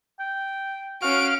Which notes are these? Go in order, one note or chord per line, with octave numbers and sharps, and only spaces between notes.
G5
C#4 F#4 F5 D7